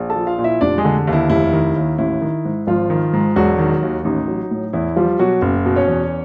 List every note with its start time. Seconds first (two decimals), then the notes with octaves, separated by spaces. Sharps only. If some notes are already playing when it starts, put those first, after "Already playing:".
Already playing: A#1
0.10 A4 A5
0.16 F3
0.27 F4 F5
0.38 A#2
0.44 E4 E5
0.61 F1 D4 D5
0.78 G#3 G#4
0.85 D3
1.07 D#2
1.13 E4
1.30 F1 E4
1.53 D#3
1.76 D#2
1.98 A1 E4
2.21 D#3
2.45 G#2
2.67 G#1 F3 F4
2.90 D#3
3.13 G#2
3.36 E1 F#3 F#4
3.59 D#3
3.82 D#2
4.05 A1 D#4
4.28 F#3
4.51 A2
4.73 E2 E4
4.96 F3 G3 F4
5.19 B2 F#3 F#4
5.42 F#1
5.66 B2
5.76 C#4 C#5
5.88 E2